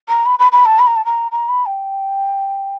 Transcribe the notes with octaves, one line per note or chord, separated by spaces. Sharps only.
A#5
B5
B5
B5
A5
B5
A#5
A5
A#5
A#5
B5
G5